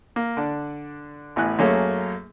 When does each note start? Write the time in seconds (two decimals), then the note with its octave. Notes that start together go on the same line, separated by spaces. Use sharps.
0.16 A#3
0.37 D3 D4
1.36 A1 A2 B3 G#5 F#6
1.59 F#2 A3 A#3 C#4 G#4 C#5